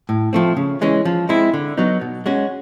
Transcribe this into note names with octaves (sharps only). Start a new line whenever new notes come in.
A2
F3 A3 C4
C#3
E3 G#3 C#4
F3
G#3 C4 E4
D3
F#3 B3 D#4
B2
G#3 C#4 F#4